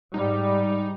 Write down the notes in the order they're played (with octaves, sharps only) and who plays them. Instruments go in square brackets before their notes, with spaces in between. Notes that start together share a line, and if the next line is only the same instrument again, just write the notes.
[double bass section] G#2 G3 [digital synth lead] D#4